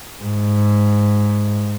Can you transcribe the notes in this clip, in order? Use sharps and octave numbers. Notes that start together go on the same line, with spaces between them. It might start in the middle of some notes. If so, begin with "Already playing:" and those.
G#2